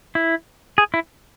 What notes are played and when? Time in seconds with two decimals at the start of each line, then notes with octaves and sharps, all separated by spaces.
0.15 E4
0.78 G#4
0.94 E4